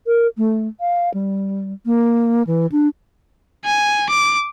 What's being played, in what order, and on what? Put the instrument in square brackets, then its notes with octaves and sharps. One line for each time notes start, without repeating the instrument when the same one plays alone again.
[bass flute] A#4
A3
F5
G3
A#3
E3
D4
[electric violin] G#5
D6